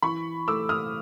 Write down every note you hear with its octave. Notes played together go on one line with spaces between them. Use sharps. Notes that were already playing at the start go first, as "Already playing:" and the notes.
E3 B5 C#6
A3 D6 E6
D#6 F6